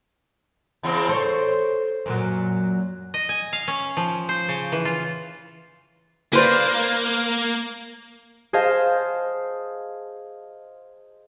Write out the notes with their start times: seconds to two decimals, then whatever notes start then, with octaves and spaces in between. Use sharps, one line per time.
0.83 E2 C#3 C4
1.09 A4 C5 C#5
2.06 F#2 A#2 F#3
3.14 D#5
3.29 G#5
3.53 F5
3.68 C#4
3.97 F3
4.29 C5
4.49 C#3
4.72 E3
4.85 F4
6.33 A#3 B4 C5 D5
8.53 G#4 C5 D#5 F5 A5